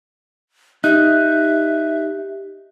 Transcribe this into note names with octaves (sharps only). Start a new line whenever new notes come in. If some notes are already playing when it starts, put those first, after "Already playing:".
D#4 G4 E5 F#6